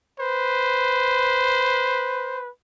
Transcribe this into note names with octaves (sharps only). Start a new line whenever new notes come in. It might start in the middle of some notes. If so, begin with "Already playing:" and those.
B4 C5